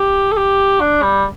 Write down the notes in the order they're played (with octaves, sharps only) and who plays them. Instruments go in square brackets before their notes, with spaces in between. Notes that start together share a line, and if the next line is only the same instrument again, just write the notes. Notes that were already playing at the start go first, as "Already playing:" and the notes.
Already playing: [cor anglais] G4
A4
G4
D4
G3